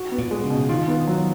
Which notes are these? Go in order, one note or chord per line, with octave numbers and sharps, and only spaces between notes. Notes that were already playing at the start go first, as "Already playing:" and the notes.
Already playing: F#4
B3
A#2
G#3
C#3
B2
D#3 F4
B3
F#3